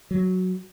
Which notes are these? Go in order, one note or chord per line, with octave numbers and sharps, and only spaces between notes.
F#3